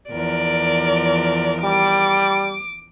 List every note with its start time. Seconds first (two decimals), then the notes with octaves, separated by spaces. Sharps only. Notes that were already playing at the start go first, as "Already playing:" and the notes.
0.11 E2 F3 A#4 D5
1.63 G3 D6